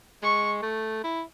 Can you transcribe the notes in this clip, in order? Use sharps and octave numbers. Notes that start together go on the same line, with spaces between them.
G#3 C#6
A3
E4